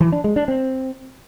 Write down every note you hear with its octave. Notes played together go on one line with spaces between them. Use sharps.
E3
D4
G#3
D4
C4